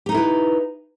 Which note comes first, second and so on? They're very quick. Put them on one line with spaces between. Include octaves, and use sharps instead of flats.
G4 D#4 A4 E4 B4